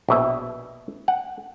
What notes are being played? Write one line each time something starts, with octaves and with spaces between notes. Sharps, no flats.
A#1 B2 E5
F#5